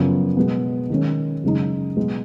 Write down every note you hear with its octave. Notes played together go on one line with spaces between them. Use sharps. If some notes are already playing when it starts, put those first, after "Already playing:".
Already playing: F#2 C#3 F3 B3
B2 G#3 B3
D#3 G#3 C#4
F#2 C#3 G#3 D#4
B2 G#3 B3